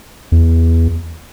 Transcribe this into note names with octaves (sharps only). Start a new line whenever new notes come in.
E2